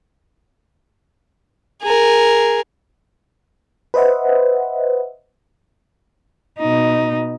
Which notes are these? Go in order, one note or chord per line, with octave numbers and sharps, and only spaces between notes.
G#4 A#4
B4 C5 D#5 E5 F#5
B2 D#4